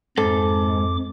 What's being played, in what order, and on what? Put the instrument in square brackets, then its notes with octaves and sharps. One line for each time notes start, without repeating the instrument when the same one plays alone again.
[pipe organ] F2 D6 [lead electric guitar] G#2 [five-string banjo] A4